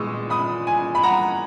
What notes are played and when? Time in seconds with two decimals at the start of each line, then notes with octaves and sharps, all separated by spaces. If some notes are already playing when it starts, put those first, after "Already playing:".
Already playing: A#2 G#3 B3 C#6 D#6 E6
0.30 B5 D#6
0.67 G#5
0.95 B5
1.03 F#5 A#5